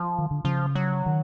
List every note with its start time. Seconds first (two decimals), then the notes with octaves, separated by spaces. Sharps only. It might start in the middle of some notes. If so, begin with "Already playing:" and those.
Already playing: F3
0.18 D#3
0.31 D3
0.44 C#3 F3
0.75 F#3
1.06 D#3